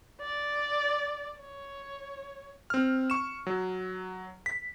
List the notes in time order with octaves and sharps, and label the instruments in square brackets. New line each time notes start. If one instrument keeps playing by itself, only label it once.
[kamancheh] D5
C#5
[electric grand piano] C4 F6
C#6 E7
F#3
B6